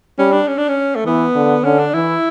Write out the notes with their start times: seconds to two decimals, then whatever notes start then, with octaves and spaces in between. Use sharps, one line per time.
0.19 G3 C#4
0.32 D4
0.48 C#4
0.58 D4
0.68 C#4
0.96 A3
1.05 E3 B3
1.35 D3
1.64 D3 C#4
1.79 D4
1.93 E3 E4